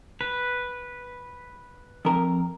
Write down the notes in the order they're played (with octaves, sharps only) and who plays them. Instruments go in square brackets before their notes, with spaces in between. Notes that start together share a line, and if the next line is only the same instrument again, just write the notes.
[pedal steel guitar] B4
[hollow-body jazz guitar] F2 A#4